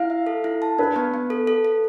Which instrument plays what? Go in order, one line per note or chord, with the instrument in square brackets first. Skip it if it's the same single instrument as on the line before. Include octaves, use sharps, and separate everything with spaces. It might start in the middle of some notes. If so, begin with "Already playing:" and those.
Already playing: [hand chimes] E4 [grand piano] F5
[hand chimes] E5
A4
E4
A5
[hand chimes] D4 [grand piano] B4
[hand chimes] B3
B3
A4
A4
A4